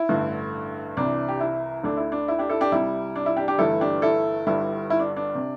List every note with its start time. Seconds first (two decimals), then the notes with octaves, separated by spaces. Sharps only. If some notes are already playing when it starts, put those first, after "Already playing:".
Already playing: E4
0.09 A1 G2 D3 A3
0.97 C2 C3 E3 D4
1.29 G4
1.40 E4
1.83 D2 D3 A3 D4
1.97 E4
2.12 D4
2.28 E4
2.39 D4 G4
2.49 E4 A4
2.61 D4 G4
2.72 C2 C3 G3 E4
3.16 D4
3.26 E4
3.37 D4 G4
3.48 D4 G4
3.58 G1 G2 E3 A3 E4 A4
3.81 D4 G4
4.02 E4 A4
4.47 G1 G2 D3 G3 E4
4.90 E4
4.99 D4
5.16 D4
5.35 C3